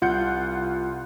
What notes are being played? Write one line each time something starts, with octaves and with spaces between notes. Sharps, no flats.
C2 F4 F#5 F#6 G6 C#7